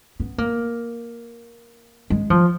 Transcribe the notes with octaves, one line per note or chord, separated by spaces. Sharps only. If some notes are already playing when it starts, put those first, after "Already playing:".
B3
A#3
G#3
F3